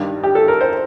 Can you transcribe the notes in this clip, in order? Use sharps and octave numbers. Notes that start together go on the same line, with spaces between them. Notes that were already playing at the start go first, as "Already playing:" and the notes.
Already playing: G2 D#3 G3
G4
A4
A#4
C5